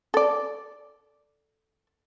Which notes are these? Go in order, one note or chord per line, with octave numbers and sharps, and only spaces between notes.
A4 D5